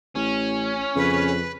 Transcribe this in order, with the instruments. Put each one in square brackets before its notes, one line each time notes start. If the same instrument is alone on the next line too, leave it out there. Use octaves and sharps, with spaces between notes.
[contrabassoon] A1 [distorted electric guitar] C#4
[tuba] F2 [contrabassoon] C#3 [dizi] B4